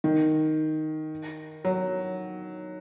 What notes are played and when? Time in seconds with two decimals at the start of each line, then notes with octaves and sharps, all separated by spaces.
0.04 D#3
1.65 F#3